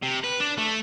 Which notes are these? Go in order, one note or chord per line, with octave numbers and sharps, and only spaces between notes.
C3
B4
D4
A3